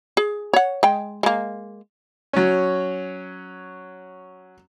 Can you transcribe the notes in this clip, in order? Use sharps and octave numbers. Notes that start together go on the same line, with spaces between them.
G#4
C#5 F#5
G#3 G5
G#3 A#3
F#3 C#4